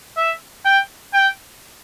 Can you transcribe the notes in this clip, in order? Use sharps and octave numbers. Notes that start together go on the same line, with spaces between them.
E5
G5
G5